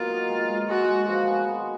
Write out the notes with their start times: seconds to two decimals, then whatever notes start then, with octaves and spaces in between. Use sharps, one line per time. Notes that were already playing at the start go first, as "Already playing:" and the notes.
Already playing: B2 F#3 A#3 F4
0.10 D#4
0.29 G#3
0.49 G#3
0.68 G#3 F#4
0.89 G#3
1.09 F3 F#4
1.27 B3
1.48 B3